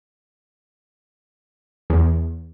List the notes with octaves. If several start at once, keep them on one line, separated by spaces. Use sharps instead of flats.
E2